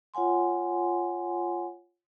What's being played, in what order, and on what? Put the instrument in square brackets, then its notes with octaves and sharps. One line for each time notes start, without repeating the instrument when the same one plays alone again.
[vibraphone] F4 C#5 F#5 G#5 C6